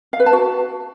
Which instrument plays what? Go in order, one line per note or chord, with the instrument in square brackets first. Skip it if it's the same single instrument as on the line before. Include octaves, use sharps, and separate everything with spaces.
[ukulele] F5
B4
A5
F#4